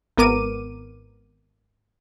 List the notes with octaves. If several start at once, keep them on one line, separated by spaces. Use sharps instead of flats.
G#1 B3 A#4 D6 D#7